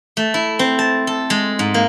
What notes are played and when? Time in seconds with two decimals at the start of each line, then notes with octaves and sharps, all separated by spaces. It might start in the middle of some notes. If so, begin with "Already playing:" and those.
0.17 A3
0.34 E4
0.59 C4
0.79 A5
1.07 A4
1.30 G#3
1.59 G#2
1.74 A#3